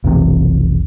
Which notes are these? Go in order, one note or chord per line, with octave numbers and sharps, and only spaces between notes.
F1 B1 C3 E3